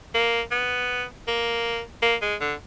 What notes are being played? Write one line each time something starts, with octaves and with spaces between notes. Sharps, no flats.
A#3
B3
A#3
A#3
G#3
D3